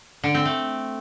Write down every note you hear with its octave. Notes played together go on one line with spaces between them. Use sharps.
D3
C4
A3